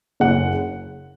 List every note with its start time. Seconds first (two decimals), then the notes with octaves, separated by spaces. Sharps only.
0.20 F#1 F#2 C#3 F#5